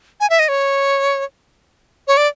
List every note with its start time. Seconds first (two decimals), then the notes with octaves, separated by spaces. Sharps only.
0.20 G#5
0.30 E5
0.39 D#5
0.48 C#5
2.08 C#5
2.17 D5